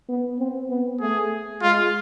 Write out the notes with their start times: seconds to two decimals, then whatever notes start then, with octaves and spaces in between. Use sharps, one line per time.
0.09 B3
0.40 C4
0.70 B3
1.01 A3 G#4
1.62 G#3 F4